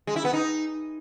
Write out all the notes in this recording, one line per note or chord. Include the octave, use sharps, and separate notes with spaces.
G#3
E4
B3
D#4